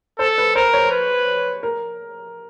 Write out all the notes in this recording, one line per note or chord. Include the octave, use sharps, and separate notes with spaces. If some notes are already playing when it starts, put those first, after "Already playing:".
A4 C5
B4
A#4 C5
C#5
B4
A#4